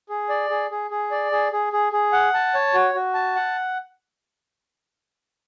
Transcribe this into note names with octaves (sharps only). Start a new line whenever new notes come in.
G#4
D5
G#4
G#4
G#4
D5
G#4
G#4
G#4
G#4
F#5
A5
C#5
F#4
F#4
A5
F#5